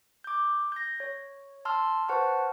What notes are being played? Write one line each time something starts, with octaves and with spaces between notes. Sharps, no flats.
D6 G6
G6 A#6
C#5
A5 C6 E6 F6
B4 C5 F#5 A5 C#6 F6